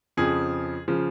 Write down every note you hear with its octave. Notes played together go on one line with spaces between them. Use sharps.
F2 C#3 F3 G#4
C#3 F3